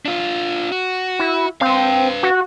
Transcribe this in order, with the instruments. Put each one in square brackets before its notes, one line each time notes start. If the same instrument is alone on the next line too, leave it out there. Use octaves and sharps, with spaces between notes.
[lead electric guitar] D4 F4
F#4
[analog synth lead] E4
[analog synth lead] C4 [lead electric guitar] B4 F5
[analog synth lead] F#4